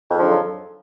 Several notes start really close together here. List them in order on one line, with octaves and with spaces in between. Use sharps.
F2 G#2 F3 D3 F#3